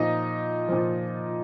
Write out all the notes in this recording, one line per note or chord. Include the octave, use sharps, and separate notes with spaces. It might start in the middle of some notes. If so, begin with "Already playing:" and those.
Already playing: A#2 F3 D#4 D#5
A#2 F3